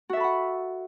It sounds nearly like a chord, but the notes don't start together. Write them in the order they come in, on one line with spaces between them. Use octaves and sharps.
F#4 E5 A4 B5 F#5